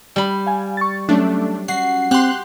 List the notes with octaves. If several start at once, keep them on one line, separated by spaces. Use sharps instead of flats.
G3 B5
F5 G#5
C#6 A6
F#3 A3 C#4 D4
F#4 C7
C4 G4 C6 F#6